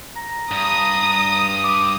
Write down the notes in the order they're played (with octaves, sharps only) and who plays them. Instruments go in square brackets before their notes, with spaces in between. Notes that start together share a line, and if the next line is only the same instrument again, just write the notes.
[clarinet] A#5
[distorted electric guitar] G2 [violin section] D#6
[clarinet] D6